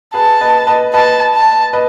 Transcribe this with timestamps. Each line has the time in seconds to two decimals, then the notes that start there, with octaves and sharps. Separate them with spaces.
0.14 G#4 B4 A5
0.41 B4 D#5
0.67 B4 D#5
0.94 B4 D#5 A5
1.34 A5
1.73 B4 D#5